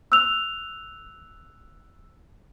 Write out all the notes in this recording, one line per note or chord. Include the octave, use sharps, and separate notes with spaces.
E6 F#6 F7